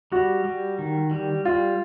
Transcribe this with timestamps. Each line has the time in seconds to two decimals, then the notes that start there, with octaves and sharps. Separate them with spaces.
0.12 G3 F#4
0.45 G3
0.79 D#3
1.11 G3
1.45 G3 F4